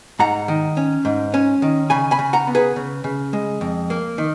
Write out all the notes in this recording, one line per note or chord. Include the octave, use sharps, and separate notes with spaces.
G#2 F#5 A#5
D#3
C#4
G#2
C#4
D#3
C#3 G#5 B5
G#5 B5
C#3
F#5 A#5
B3
G#4 B4
C#3
C#3
G#3
F2
A#3
D#3